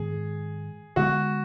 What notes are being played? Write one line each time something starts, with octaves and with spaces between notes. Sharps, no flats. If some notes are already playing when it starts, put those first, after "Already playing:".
Already playing: G#2 D#3 G#3 B3 G#4
D3 G#3 B3 F#4